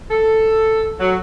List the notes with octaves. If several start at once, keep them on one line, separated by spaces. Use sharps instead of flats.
A4
F#3